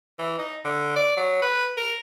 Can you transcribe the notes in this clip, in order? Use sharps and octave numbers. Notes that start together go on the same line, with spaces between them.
E3
D#4
D3
D5
F#3
B4
A#4